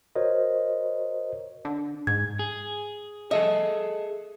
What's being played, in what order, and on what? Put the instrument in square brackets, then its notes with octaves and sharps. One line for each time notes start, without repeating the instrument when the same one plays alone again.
[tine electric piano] F#4 A#4 C5 C#5 D#5
[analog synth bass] D3
[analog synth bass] G#2 [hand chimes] G#6
[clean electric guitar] G#4
[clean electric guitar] G#4 A4 E5 [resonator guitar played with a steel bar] D#5